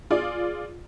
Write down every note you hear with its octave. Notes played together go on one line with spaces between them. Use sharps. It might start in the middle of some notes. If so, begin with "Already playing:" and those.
F4 G#4 D5